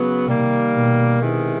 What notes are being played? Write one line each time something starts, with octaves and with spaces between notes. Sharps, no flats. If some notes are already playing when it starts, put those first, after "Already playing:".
Already playing: C#3 F#3 B3
C3 D#3 G3 A#3
B2
C3 D#3 G#3 B3 E4